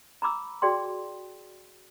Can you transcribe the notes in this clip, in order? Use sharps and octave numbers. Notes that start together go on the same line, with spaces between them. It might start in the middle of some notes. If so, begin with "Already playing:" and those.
A#5 B5 D6 E6
F#4 G#4 D5 G5 C6